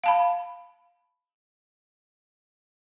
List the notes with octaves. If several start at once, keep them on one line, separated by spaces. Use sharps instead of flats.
F5 A5 B5